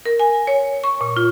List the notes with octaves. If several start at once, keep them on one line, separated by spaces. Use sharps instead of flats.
A#4
G#5
C#5
C#6
A#2
F4